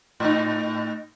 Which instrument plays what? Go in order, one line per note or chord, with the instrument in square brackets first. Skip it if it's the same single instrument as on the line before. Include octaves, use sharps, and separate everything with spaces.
[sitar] A2 D#4